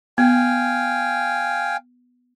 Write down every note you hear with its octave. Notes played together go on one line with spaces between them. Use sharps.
B3 F5 G5 G#5